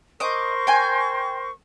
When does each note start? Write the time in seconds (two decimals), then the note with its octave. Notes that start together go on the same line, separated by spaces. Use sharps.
0.20 A#4 C5 D#5 C#6 D6
0.67 G5 G#5